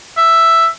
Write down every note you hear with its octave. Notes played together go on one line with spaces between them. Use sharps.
E5